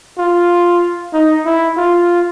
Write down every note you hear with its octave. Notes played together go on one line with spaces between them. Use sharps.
F4
D#4
E4
F4